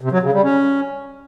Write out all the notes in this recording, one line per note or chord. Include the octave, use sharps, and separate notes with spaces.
C3
F#3
C#3
G3
C#4